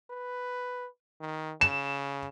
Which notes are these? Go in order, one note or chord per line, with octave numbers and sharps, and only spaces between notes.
B4
D#3
C#3 E7